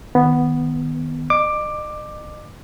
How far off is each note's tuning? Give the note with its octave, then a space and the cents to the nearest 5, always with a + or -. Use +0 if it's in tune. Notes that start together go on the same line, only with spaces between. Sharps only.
D#3 +0 B3 +0
D#5 -40 D6 +10